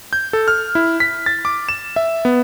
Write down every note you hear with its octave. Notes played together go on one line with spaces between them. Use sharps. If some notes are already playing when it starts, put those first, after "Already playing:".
G6
A4
F6
E4
B6
A6
D6
E7
E5
B3